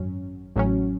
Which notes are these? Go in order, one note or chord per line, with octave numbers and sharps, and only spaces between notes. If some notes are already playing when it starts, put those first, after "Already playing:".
Already playing: G#1 F#2 F#3 C#4
A1 A2 F#3 C#4